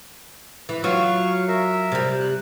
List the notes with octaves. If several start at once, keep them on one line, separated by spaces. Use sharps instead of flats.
E3
F#3 F4 F5 C#6
A#4 E5
C3 G3
F#6